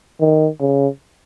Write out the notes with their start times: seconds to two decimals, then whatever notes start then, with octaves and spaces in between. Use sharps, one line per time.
0.20 D#3
0.60 C#3